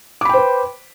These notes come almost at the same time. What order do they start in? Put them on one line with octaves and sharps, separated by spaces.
D6 B5 G5 C5 B4